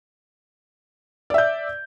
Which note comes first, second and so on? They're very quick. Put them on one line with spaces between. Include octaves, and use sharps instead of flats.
D5 E5 G6